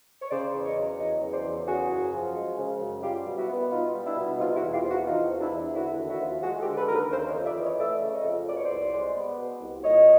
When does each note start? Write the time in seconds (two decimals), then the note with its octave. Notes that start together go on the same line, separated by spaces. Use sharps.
0.22 C#5
0.31 C#3 C5 D5
0.54 E2
0.65 C#5 D#5
0.76 F#3
0.99 E2 C#5 D#5
1.22 C#3
1.33 C5 D5
1.44 E2
1.67 C#3 F#4 G#4
1.90 F#2
2.13 F3
2.36 G#3
2.58 C#3
2.81 F#2
3.03 G3 F4 G4
3.26 B2
3.37 E4 F#4
3.49 B3
3.71 B2 D#4 F4
3.94 G3
4.06 D4 E4
4.16 B2
4.39 C3 D#4 F4
4.56 E4 F#4
4.62 E2
4.73 F4 G4
4.85 F3
4.90 E4 F#4
5.07 E2 D#4 F4
5.30 C3
5.41 D4 E4
5.52 E2
5.75 D3 E4 F#4
5.98 D#2
6.09 E4 F#4
6.21 F3
6.43 G#3 F#4 G#4
6.61 G4 A4
6.66 D3
6.77 A4 B4
6.86 D#2 A#4
6.94 A4 B4
7.11 C#3 A#4 C5
7.28 C#5 D#5
7.34 F2
7.46 D5 E5
7.57 E3
7.63 C#5 D#5
7.80 A3 D5 E5
8.03 C#3
8.14 C#5 D#5
8.24 F2
8.47 B2 D5
8.57 C#5
8.65 C5 D5
8.70 C2
8.93 G#3
9.16 B3
9.39 B2
9.61 C2
9.84 A#2 C#5 D#5